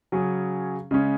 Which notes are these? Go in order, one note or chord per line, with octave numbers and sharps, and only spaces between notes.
C#3 F#3 C#4 G#4
C#3 G#3 C#4